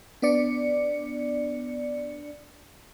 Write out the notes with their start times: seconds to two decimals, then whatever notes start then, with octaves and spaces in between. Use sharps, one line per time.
0.22 B3 D4 D5 C#7